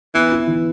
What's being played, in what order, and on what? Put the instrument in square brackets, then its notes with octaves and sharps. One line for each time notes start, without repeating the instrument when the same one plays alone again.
[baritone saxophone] E3 [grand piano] B3
[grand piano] E4
E3